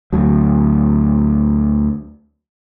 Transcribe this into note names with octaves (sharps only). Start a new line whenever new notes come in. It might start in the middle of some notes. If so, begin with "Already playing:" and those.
D2 F#3